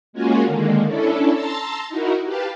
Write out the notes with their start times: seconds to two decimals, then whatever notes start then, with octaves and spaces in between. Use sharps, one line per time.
0.13 G#3 A#3 C#4 F4 F#4 G#4
0.46 D3 D#3 G#3 A#3
0.86 C#4 D4 E4 A4
1.35 A5 A#5 C6 E6 A6
1.89 D#4 E4 F#4 A#4
2.24 G4 B4 F5 A5